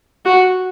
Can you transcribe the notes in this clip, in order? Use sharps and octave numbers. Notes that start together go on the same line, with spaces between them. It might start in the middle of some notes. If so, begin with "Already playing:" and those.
F#4